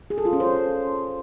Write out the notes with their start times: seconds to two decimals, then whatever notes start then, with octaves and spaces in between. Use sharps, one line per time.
0.10 G#4
0.18 A4
0.25 F4
0.33 C#4
0.40 C5